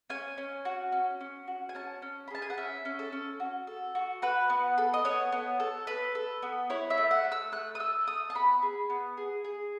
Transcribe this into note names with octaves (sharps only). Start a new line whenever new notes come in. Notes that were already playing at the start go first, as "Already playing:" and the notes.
C#4 G#5
C#4
F#4
C#4
C#4
F#4
G#5
C#4 A5
C#4
B5
G#4 A5
G#5
F#5
C#4 E5
C#4
A4
C#4
F#4
A4
F#4
F#4 B4
B3
A4
D#5
B3 C#5
B3
A4
A4 B4
A4
B3
E4 C#5
E5
A3
F#5
A3
E6
A3 F#6
D#6
A4 E6
A3 D#6
A5
B3 B5
G#4
B3
G#4
G#4